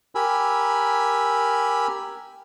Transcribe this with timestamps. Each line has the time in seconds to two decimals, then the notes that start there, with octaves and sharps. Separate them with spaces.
0.15 G4 A#4 G#5 B5 E6